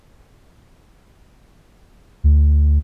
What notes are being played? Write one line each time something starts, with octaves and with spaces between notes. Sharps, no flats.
D2